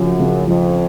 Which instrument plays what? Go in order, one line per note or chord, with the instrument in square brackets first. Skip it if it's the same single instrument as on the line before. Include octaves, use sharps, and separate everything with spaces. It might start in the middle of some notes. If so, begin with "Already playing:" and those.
Already playing: [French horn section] F#2 [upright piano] C#3 F3
[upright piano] C#3
[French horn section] F2 [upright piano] F3